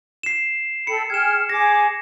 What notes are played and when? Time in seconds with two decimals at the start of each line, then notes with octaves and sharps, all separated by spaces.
0.23 C7 E7
0.87 A4 G5 B5 C#7
1.10 G#4 G5 F6 G#6 E7
1.49 G#4 D6 A#6